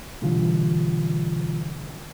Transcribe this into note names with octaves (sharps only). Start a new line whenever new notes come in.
B2 D3 E3 G3 F4